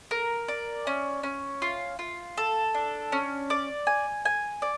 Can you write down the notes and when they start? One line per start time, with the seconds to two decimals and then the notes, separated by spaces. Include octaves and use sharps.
0.11 A#4
0.48 D5
0.87 C#4
1.23 C#4
1.62 F4
1.99 F4
2.37 A4
2.74 D4
3.12 C#4
3.50 D5
3.87 G#5
4.25 G#5
4.62 D5